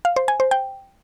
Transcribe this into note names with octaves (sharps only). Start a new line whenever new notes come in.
F5
C5
G#5
C5
G5